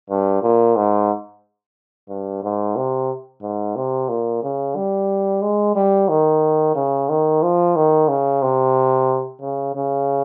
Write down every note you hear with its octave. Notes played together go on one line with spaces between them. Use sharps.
G2
A#2
G#2
G2
G#2
C3
G#2
C3
A#2
C#3
G3
G#3
G3
D#3
C#3
D#3
F3
D#3
C#3
C3
C#3
C#3